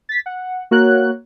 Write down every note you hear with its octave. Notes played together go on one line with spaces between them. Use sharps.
A6 B6
F#5
A#3 F#4 A#4 C#5 F#6